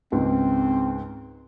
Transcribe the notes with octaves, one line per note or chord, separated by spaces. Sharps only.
C#2 G#2 C4